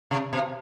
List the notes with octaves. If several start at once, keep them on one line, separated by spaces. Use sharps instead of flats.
C3
B2